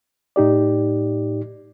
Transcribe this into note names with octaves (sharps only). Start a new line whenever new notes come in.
A2 D#4 G4 D5